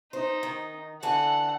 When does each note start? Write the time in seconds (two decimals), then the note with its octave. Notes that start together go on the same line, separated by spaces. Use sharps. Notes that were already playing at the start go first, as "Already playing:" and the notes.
0.13 D#4 C5
0.43 D#3
1.03 D3 E3 A4 F#5